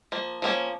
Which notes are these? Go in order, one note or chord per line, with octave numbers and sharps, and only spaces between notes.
F3 A#3
F3 A#3 C#4